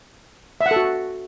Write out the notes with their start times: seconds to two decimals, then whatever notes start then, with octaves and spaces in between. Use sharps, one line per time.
0.61 E5
0.66 F#5
0.71 A4
0.76 F#4